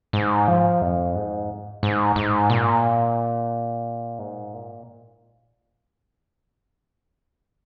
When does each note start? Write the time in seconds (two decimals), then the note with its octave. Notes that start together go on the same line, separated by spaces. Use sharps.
0.13 G#2
0.48 F3
0.82 F2
1.16 G#2
1.83 G#2
2.16 G#2
2.50 A#2
4.19 G#2
4.54 A#2